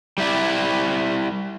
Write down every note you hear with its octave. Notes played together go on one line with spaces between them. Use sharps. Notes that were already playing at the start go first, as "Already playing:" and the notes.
G3 E4 D5